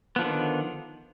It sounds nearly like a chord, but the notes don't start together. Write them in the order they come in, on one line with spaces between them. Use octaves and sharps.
B3 F3 D3 D#3